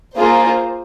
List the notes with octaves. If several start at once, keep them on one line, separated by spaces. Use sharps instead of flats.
A#3 F4 G#4 C5